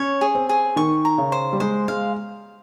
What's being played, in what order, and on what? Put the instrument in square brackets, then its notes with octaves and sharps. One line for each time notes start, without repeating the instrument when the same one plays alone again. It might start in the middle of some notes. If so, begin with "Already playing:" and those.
Already playing: [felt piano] C#4 [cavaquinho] C#5
[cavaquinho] G#4
[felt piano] C4
[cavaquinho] G#4
[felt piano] D#3 [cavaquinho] C#6
[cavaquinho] A#5
[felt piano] C#3
[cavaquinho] C5
[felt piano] G3
[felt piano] G#3 [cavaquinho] C5
[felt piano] G#3 [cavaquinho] F5